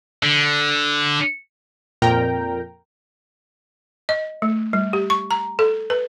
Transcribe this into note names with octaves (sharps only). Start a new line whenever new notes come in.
D3
F2 A#2 A#4 G5 A#5
D#5
A3
G3
G4
C#6
A#5
A4
B4